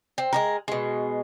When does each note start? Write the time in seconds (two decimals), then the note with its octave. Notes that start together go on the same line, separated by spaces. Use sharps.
0.18 C4
0.33 G#3 C4 A#4
0.68 B2 G#3